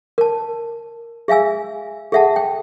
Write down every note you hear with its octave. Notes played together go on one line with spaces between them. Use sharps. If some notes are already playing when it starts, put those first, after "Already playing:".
A#4 A5
G#4 E5 F5 G#5 E6
G#4 A4 E5 F#5 A5
G5